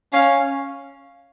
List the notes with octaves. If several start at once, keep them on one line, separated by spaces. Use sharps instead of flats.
C#4 F5